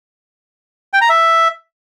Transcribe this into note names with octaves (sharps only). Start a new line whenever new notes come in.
G5
A#5
E5